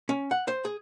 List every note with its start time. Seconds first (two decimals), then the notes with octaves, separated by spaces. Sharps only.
0.09 C#4
0.31 F#5
0.48 C5
0.65 G#4